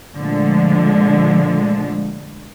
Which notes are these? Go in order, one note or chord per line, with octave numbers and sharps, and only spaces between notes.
A#2 D3 F3 G#3 A3